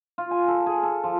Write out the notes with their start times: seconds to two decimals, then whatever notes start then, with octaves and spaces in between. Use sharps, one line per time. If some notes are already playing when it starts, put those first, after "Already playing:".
0.18 F4
0.31 G#5
0.48 A4
0.66 G#4
0.83 A4
1.04 F3